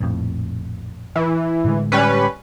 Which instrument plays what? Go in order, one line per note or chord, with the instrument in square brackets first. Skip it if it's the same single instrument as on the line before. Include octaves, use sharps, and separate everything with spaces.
[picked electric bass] A#1 F2 A2
[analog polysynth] E3
[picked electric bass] A2 D3 G#3
[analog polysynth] G3 C#4 B4